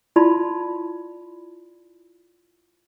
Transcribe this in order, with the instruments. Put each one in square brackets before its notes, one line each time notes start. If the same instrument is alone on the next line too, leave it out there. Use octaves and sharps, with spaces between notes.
[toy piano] E4 F4 D5 A5 B5 C6